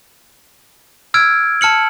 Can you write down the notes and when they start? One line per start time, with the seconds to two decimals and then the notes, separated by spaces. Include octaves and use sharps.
1.14 E6 F6 G#6 D7
1.61 A5 F6 C#7 F#7